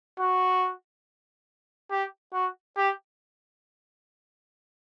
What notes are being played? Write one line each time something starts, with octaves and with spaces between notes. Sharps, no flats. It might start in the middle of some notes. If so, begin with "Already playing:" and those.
F#4
G4
F#4
G4